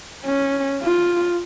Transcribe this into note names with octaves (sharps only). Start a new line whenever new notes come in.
C#4
F4